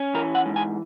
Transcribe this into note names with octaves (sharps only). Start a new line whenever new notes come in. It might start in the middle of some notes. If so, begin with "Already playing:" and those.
Already playing: C#4
E3 A#4
F#5
G#2
G#5